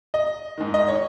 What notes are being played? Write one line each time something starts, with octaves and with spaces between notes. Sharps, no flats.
D#5
G#2 D#3
D#5
C#5